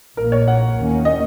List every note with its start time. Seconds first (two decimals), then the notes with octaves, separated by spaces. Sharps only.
0.17 A#1 A#2 A#3 A#4
0.32 C#5
0.48 F#5
0.76 D#2 D#3 A#3 C#4
1.05 D#5